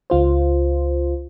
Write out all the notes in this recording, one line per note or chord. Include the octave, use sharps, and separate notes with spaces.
C#2 F4 C5